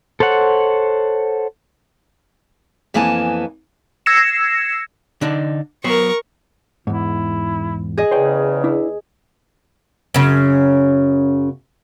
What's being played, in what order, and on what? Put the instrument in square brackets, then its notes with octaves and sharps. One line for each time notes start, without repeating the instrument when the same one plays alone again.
[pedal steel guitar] A4 C5 C#5 F#5
[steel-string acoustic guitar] F2 E3 A#3 B3 G#5 A5
[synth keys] E6 G#6 A#6 C7 C#7 E7
[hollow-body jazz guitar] D3 D4 D#4
[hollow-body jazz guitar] F#3 B3 C5 [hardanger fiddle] A#4 C#6
[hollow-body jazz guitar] E2 G#2 [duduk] E4
[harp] G#4 D#5
[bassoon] E2 [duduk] C#3 [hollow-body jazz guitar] C5 C#5 G5
[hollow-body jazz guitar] D4 E4
[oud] F#2 C#3